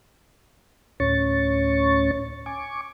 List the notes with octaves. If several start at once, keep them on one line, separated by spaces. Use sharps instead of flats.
D2 A2 C#4 C#5 C#6 A6
G#5 C#6 D6